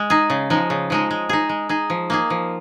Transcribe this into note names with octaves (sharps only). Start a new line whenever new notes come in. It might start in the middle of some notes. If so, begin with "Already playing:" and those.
Already playing: G#3
D#4 G#4
C#3
F3 G#3 D#4
C#3
F3 G#3 D#4
G#3
D#4 G#4
G#3
D#4 G#4
F3
A#3 D#4 G#4
F3